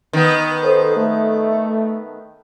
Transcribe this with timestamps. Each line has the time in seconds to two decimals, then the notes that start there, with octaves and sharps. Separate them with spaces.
0.13 D#3 B3
0.63 A4 C5
0.96 A3